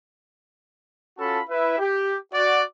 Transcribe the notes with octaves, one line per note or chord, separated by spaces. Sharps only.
C#4 F4 F#4 A4 A5 B5
E4 B4 E5
G4
F#4 D5